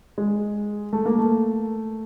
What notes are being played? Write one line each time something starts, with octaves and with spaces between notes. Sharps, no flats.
G#3
A3
A#3
A3